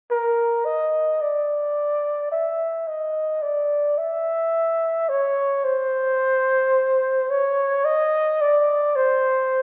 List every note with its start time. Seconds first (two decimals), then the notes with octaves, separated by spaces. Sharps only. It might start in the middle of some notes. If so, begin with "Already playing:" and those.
0.11 A#4
0.66 D#5
1.22 D5
2.32 E5
2.88 D#5
3.42 D5
3.98 E5
5.09 C#5
5.65 C5
7.30 C#5
7.85 D#5
8.41 D5
8.96 C5